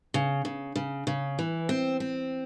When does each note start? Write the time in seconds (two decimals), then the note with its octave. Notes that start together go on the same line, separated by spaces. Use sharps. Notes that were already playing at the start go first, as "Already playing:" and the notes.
0.14 C#3
0.45 C#3
0.76 C#3
1.07 C#3
1.39 E3
1.69 C4
2.00 C4